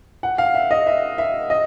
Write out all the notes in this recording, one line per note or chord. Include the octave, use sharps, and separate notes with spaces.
F#5
F5
E5
D#5
E5
E5
D#5